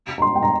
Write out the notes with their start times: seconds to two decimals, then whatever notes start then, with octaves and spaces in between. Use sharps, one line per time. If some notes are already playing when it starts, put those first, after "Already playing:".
0.18 A#5
0.22 C6
0.36 G5
0.43 A#5